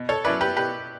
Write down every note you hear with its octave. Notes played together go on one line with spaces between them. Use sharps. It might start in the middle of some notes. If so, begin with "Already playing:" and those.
Already playing: B2
A4 C#5
F#3 C#4 E4 B4 D5
G4 B4
B2 G4 B4